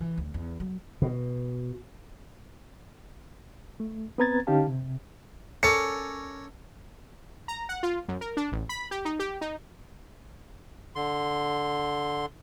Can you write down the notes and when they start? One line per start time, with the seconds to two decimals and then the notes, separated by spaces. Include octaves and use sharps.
0.01 E3
0.18 D2
0.34 E2
0.60 F#3
1.02 B2
3.80 A3
4.18 B3 C4 B4 A#5 G#6 A6
4.47 D3 C#4 D#4 G4 F5 A5
4.68 C3
5.63 C#4 A4 A#4 C#5 D5 C#7
7.48 A#5
7.69 F#5
7.83 F4
8.08 F#2
8.21 A#4
8.37 D4
8.52 A1
8.69 B5
8.91 G4
9.05 D#4
9.19 G4
9.41 D#4
10.95 D3 C6